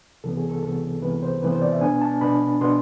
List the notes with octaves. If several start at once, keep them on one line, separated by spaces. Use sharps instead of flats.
C2 C3 E3 B3 A4
G#4
A4
C2 C3 E3 B3 A4
C2 C3 E3 B3 B4
C5
C2 C3 E3 B3 B4
C5
D5
E5
B2 B3 D4 G#5
A5
B2 B3 D4 B5
B2 B3 D4 C6